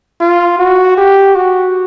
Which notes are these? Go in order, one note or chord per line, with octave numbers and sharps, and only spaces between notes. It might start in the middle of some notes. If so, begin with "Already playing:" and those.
F4
F#4
G4
F#4